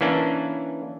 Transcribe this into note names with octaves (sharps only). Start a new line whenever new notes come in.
E3 A#3 C#4 D4 B4